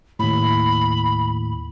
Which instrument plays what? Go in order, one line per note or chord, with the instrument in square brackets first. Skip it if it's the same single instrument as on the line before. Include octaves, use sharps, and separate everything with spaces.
[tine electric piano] D#2 A2 [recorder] B5